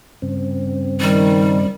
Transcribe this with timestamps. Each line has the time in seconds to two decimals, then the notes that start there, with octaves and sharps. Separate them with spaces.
0.22 G2 C#3 C4
1.01 D#3 G3